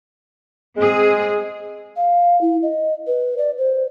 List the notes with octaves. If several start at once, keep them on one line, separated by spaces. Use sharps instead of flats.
G#3 C4 G#4
F5
E4
D#5
B4
D5
C5